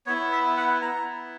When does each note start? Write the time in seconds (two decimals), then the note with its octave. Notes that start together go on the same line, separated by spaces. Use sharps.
0.06 B3 E4 C#5
0.32 E5
0.57 F#5
0.82 B3 E4 A#5